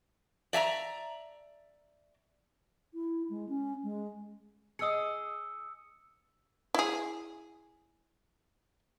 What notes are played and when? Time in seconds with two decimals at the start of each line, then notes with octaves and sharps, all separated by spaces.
0.53 D5 E5 A5 A#5
2.94 E4
3.30 G#3
3.49 C#4
3.83 G#3
4.79 G#4 D#5 D#6 E6 C#7
6.74 E4 G#4